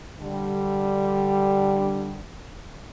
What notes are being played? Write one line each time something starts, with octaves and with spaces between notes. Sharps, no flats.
D3 G3